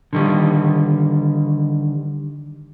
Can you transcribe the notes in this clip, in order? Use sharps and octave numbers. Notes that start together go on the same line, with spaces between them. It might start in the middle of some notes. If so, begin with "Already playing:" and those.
D3 D#3 G3